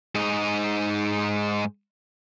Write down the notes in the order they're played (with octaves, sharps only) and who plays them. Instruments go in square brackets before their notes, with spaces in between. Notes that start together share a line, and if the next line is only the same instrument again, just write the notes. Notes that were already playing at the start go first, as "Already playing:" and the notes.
[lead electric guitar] G#2 D#4